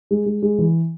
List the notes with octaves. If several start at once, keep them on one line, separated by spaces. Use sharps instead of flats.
G#3
G#3
G#3
E3